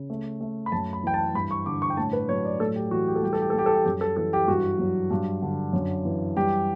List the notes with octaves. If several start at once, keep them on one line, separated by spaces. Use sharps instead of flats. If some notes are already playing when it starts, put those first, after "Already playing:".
Already playing: C#3
A3
A3
B5
F#2 A5
B5
E3 G5
A5
G2 B5
C#6
D3 D6
C#6
G5
A2 A5
B4
F#3 C#5
D5
A2 A4
G4
E3 F#4
G4
A4
G3 G4
A4
G4
A4
G3 G4
A4
G4
F#2 G4
A4
E3 A4
G4
G2 F#4
F#3
G2
D3
F#2
E3
G3 G4